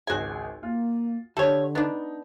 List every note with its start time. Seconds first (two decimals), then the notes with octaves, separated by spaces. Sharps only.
0.07 G#1 C#2 F#4 G#4 G#5
0.63 A#3 F4
1.37 D3 G4 A4 C#5
1.75 B3 D4 D#4